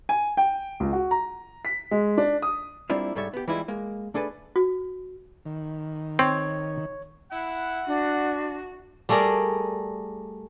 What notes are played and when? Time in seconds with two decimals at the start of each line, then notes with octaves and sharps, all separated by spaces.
0.09 G#5
0.37 G5
0.80 C#2
0.93 F#4
1.11 A#5
1.65 B6
1.91 G#3
2.18 D4
2.42 D#6
2.90 G3 A#3 C4 D4 E4 F4
3.15 G#2 G3 A4 C#5 E5
3.34 B3 G4
3.48 E3 G3 G#3 E4 F4
3.68 G#3 A#3
4.14 A3 D4 G#4 A4 B4
4.56 F#4
5.46 D#3
6.19 C4 C#5
7.32 E4 F#5
7.87 D4 F#4
9.09 G3 A3 G#4 A#4 D5